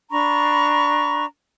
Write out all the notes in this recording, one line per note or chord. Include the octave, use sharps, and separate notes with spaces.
D4 A#5 B5 C#6